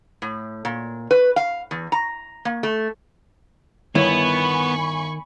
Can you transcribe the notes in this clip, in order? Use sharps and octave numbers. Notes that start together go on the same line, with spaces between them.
A2
A#2
B4
F5
E2
A#5
A#3
A3
G1 D#3 B3 E4 C#5 G#5 B5 C#6